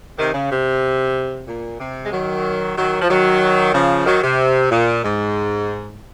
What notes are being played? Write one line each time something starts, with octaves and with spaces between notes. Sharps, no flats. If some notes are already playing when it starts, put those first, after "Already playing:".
C3 D#3
C#3
C3
A#2
C3
G#3
D#3 F#3
D#3 F#3
F3
D#3 F#3
C#3 F3
D#3 F#3
C3
A#2
G#2